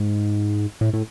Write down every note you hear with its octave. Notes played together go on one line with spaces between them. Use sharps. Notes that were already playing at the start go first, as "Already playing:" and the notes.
Already playing: G#2
A2
A2